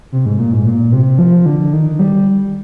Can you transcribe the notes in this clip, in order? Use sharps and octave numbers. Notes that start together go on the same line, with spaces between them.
C3
G#2
A#2
G#2
A#2
C3
F3
D3
D#3
G3